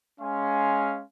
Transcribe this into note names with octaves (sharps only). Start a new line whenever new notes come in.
G#3 C#4 F5 G#5 C6